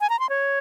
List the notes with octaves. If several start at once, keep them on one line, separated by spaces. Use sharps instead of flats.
G#5
A#5
C6
C#5